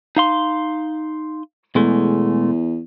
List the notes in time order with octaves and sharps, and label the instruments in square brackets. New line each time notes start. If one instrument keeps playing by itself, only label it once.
[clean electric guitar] D#4 F5 C6
[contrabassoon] E2 [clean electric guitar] B2 G#3 A3